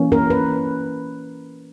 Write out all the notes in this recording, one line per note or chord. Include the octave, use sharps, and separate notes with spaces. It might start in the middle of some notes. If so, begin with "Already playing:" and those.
Already playing: E3 A#3 C#4
A#4
B4